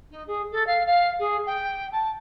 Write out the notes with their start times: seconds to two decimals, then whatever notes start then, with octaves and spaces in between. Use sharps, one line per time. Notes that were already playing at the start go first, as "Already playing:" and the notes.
0.10 D#4
0.27 G#4
0.51 A4
0.66 F5
0.86 F5
1.19 G#4
1.46 G5
1.91 A5